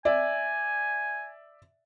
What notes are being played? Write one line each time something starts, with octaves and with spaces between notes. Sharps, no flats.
D5 E5 G#5